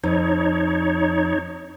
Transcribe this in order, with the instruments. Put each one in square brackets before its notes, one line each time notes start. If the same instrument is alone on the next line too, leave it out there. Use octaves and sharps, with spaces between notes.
[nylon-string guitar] F2 [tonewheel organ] D#4 C#5